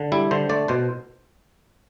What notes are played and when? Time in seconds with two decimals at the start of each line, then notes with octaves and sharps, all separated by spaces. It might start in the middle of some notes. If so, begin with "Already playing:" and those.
Already playing: D3
0.12 G3 E4
0.31 D3 C5
0.49 A3 D5
0.68 B2 C5